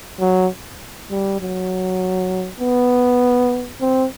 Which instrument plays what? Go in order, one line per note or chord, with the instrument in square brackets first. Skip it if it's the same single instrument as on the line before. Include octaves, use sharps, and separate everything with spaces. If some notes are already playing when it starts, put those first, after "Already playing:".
[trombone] F#3
G3
F#3
B3
C4